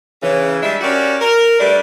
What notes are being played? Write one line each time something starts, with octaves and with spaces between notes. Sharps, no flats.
C#3 E3
G3 G#3 D4 E5
C#4 F#4 G4 A#4 D5
A#4
G3 A3 D4 B4 D5